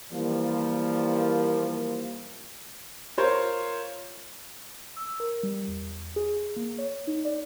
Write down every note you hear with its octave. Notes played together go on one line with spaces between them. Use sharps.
E3 F3 G3 A#3
F4 A#4 C5 C#5
E6
A#4
G3
E2
G#4
A#3
C#5
D#4
D5